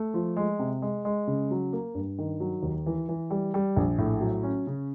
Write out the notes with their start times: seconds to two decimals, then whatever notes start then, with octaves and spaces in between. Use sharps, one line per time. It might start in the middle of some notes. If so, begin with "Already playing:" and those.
Already playing: A3
0.14 F3
0.37 G#3
0.59 C3
0.82 G#3
1.05 G#3
1.27 C#3
1.51 F#3
1.73 A#3
1.95 G2
2.19 D#3
2.40 F#3
2.63 D#2
2.86 E3
3.09 E3
3.30 G3
3.54 G3
3.76 A#1
3.98 A2
4.21 F#3
4.43 C#4
4.67 C#3